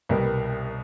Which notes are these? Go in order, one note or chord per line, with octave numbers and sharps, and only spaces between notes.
C2 B2 G3 A#4